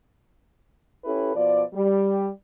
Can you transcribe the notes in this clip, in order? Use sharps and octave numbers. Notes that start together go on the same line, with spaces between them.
C#4 E4 G4 A4 B4
B2 F3 D5
G3